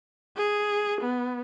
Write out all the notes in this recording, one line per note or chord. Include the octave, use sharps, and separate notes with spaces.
G#4
B3